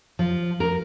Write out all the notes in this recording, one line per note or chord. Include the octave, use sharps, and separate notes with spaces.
F3
A#4